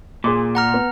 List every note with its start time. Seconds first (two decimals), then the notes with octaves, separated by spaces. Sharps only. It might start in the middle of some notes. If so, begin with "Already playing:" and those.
0.24 A#2 G#4 C6 D6
0.55 F#5 A#5 F6
0.74 B3